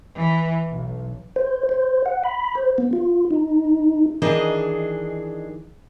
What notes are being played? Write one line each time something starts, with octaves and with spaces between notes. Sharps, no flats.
E3
B1
C5
C5
F#5
B5
C5
B3
F4
D#4
D#3 E3 D4 G#4 D#5